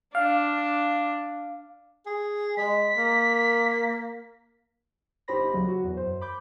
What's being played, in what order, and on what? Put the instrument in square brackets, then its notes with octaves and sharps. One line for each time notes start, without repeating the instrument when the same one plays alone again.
[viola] D4 [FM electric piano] F5
[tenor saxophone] G#4
[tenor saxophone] G#3 [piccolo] B6
[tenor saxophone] A#3
[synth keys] G1 D#4 G4 C5 B5 A#6
D2 C#3 F#3
F#3 F#4
E2
F#2 C5
B5 D6 G6